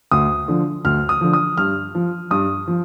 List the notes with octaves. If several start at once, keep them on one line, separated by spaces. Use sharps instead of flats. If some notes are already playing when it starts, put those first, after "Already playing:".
D2 D#6
D3 F3
D2 F6
D#6
D3 F3
D#6
G2 F6
F3
G2 D#6
F3